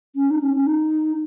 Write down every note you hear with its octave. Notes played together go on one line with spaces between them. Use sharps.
C#4
D#4
C#4
C#4
D#4